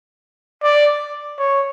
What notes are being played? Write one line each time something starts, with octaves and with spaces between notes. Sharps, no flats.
D5
C#5